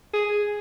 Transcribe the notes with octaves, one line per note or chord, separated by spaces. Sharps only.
G#4